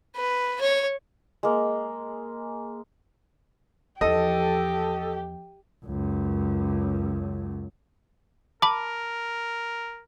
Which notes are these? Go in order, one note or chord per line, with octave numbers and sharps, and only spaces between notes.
B4
C#5
G#3 A#3
E2 F3 G4 A4 D#5
C#2 F#2
A#4 A5 B5 D6